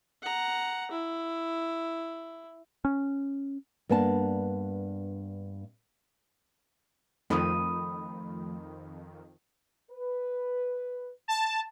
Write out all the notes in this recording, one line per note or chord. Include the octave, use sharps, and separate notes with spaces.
F#5 A#5
E4
C#4
G2 A#3 B3 D4 A5
F2 D#3 F3 A3 B5 D#6
B4
A5